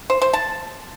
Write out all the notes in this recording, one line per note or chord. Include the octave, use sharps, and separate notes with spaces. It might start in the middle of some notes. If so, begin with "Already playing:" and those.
C5
C5
A5